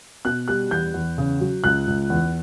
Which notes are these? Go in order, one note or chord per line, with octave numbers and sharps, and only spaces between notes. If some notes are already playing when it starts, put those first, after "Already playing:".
B2 F#6
G3 F#6
E2 G6
E2
C#3
F#3
C#2 F#6
C#2
E2